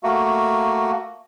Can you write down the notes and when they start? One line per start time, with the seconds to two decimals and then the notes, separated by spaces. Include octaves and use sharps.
0.03 A3 A#3 F#4